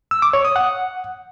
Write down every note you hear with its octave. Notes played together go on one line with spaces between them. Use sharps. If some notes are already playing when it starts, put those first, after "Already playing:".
E6
D6
C#5
D#6
F#5